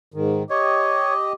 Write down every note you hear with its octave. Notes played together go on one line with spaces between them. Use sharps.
G#2 D#3
G4 C#5 D#5